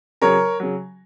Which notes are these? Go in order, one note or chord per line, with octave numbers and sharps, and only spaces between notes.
C#3 F#3 A#4 C#5
C#3 F#3